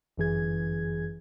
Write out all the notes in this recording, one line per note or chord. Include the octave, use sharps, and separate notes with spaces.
G1 F#2 E3 G#4 G#6